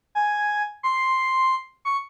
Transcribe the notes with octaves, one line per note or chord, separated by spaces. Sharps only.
G#5
C6
C#6